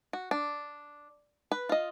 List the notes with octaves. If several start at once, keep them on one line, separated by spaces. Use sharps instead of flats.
F#4
D4
B4
F4 D#5